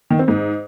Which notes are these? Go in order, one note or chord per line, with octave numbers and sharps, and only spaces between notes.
D#3
C4
G#2